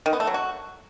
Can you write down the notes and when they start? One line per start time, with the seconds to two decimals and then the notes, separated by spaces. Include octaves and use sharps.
0.06 D#3
0.13 B3
0.20 A3
0.27 F#3
0.34 F#4